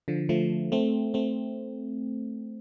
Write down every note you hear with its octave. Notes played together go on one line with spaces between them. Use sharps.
D3 F3
F3 A3
A3 C4
A3 C4